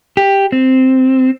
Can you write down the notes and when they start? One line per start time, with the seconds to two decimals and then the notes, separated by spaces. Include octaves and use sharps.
0.17 G4
0.52 C4